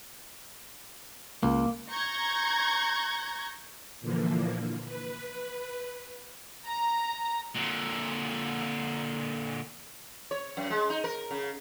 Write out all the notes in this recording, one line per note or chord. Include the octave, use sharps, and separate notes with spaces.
C#2 A#3
A#5 C#6 G6 G#6 A#6
A#2 D3 E3 F3 A#3
B4
A#5
A#2 D3
C#5
F#2
G#3
D#4
A#4
C#3